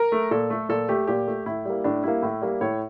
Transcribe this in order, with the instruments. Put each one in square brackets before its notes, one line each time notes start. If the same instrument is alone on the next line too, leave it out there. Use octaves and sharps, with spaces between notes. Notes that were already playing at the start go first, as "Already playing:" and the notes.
Already playing: [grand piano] A#4
A3
A#2 A4
A3
A#2 A4
A3 G4
A#2 G4
A3
A2 E4
G3 A#3
A2 D4
G3 A#3 E4
A2
G3 A#3
A2 C#5